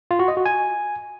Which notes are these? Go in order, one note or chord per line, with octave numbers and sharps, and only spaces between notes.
F4
F#4
D#5
F#4
G#5